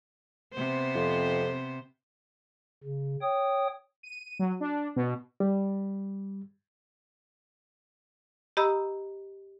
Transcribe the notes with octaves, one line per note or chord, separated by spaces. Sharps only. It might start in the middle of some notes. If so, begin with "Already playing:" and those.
C3 B3 C5
F2
C#3
C#5 G5 D#6
D#7
F#3
D4
B2
G3
G4 D#5 A#5 B5 D#6 E6